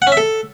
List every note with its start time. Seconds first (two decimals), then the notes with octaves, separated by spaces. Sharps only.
0.02 F#5
0.07 C#4
0.12 E5
0.17 A4